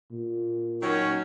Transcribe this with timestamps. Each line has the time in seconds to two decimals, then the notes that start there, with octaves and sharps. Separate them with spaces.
0.12 A#2
0.82 D#3 F#3 C#4